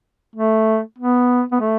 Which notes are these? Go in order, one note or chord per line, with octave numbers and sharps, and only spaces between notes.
A3
B3
B3
A3